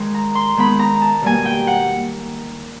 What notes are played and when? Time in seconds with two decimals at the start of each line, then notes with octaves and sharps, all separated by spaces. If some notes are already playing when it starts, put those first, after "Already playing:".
Already playing: D#3 G#3
0.14 A#5
0.35 C6
0.57 D#3 G#3 B3 B5
0.79 A#5
1.01 A5
1.22 B2 G3 A#3 G#5
1.45 G5
1.67 F#5